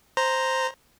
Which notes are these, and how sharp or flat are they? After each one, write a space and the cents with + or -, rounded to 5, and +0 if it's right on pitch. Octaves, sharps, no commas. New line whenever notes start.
C5 +0 A#5 +0